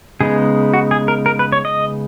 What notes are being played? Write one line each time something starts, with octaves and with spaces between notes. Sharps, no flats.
C#3 G#3 B3 D#4 G#4
F#4
G#4
A#4
A#4
B4
C#5
D#5